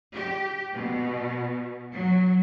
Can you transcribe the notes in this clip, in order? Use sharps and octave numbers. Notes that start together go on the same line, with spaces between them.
G4
B2
F#3